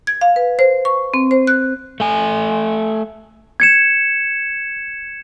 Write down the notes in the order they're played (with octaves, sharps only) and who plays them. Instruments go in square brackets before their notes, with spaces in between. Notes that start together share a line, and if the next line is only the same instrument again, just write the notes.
[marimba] G#6
F5
B4
C5
C#6
C4
C5
F#6
[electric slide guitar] A3 G#5
[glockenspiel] G#6 C#7 E7